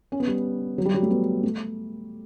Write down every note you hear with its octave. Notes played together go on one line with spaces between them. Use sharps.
C#4
B3
G3
F#3
G3
F#3
A3
B3
A3